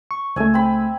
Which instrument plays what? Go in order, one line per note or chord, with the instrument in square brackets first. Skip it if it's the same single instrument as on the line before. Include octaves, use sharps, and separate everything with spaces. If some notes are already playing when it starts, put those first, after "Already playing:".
[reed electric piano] C#6
[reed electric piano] C#2 A3 [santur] E5 G#5
[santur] C4 B5